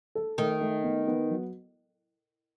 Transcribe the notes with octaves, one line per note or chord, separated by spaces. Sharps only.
A4
D#3 A3
A3
B3
B3
F#3